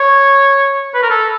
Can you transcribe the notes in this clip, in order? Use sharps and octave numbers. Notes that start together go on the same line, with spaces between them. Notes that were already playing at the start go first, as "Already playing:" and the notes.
Already playing: C#5
B4
A#4
A4